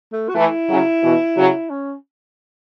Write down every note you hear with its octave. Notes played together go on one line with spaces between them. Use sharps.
A3
F#4
E3 A3 E4
C#3 F#3
B2 E3
C#3 F#3
C#4